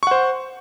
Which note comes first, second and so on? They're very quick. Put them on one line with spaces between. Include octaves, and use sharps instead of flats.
C#6 F#5 C5